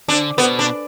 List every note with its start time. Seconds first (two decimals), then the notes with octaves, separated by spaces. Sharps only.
0.09 D3 D4
0.38 B2 B3
0.59 D4